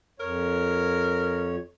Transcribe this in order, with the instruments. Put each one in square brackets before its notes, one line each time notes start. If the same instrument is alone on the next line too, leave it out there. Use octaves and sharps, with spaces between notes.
[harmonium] F2 C#5 [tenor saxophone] A#4